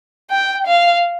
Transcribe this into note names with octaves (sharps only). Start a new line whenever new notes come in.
G5
F5